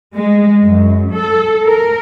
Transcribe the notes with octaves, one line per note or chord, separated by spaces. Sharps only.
G#3
F#2
A4
A#4